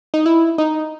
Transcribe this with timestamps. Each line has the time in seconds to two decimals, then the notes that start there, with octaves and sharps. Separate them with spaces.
0.14 D#4
0.26 E4
0.58 D#4